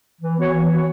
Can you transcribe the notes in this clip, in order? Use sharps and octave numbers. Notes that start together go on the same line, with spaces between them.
E3
B3 F#4 C#5
E3
B3 F#4 C#5